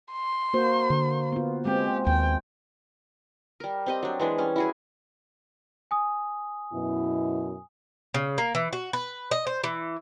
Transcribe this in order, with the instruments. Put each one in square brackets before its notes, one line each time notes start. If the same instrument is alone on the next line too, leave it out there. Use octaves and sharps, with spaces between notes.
[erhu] C6
[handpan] A#3 F#4 C5
[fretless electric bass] D3
[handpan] B3 F4
[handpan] G#3 C4 [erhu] G4
[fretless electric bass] D#2 [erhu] G5
[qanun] G3 A#4
C4 G4 D#5
F#3 D4
E3 G#3 D4
G3 C#4
E4 F#4 G#4
[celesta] G#5 D#6
[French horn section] F#2 B2 E4
[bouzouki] C#3
A#3
E3
F#4
B4
D#5
C5
E3